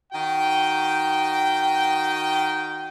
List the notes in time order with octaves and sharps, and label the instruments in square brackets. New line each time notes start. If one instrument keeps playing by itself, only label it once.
[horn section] D#3 F#4 G5